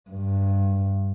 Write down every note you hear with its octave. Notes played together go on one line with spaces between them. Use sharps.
G2